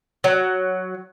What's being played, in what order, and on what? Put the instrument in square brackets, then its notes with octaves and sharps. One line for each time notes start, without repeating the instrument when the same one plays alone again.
[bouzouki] F#3